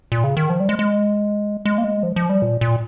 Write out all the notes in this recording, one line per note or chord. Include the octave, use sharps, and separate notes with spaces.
A#2
C#3
D#3
F3
G3
G#3
G#3
G#3
A#3
G#3
F3
F3
G3
A#2
A#2